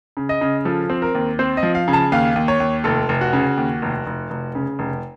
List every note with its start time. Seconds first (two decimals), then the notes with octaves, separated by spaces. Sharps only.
0.17 C#3
0.29 D#5
0.41 C#3
0.65 F3 A4
0.90 C4
1.02 A#4
1.15 D#2
1.39 C4 C5
1.57 D#5
1.63 F3
1.75 F5
1.88 C#3
1.93 A5
2.12 D#2 F5
2.36 D#2
2.48 C#5
2.60 D#2
2.84 F1 A4
3.09 F1
3.21 F#4
3.33 C#3
3.57 D#2
3.82 F1
4.06 F1
4.30 F1
4.55 C#3
4.79 F1